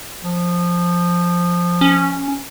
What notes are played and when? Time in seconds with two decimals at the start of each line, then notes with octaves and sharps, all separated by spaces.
0.23 F3
1.81 C#4